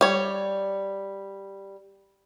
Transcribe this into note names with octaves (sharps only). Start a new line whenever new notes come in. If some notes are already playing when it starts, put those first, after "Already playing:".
G3 C#5